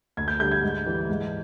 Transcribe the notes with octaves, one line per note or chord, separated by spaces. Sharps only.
D2 G#6
G6
D3 G3 G6
G#6
G#2
E3 G3
G#2